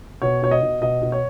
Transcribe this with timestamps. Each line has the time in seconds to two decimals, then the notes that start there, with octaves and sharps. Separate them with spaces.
0.22 B2 C#5
0.42 B2 C#5
0.51 D#5
0.62 B2
0.82 B2 D#5
1.02 B2
1.12 C#5